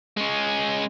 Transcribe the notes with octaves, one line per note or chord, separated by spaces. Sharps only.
G#3 C#4